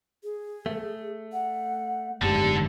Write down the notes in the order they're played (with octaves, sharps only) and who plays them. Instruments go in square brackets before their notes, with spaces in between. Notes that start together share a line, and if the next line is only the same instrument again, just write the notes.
[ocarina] G#4
[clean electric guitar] A3
[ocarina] F#5
[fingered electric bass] F#1 D2 G#2 [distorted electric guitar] D3 A4 [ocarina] G4